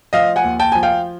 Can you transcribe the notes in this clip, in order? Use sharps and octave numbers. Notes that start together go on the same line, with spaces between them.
F3 D#5 F5
F#5 G#5
D#2
G5 A5
F3 G#5
F5 G5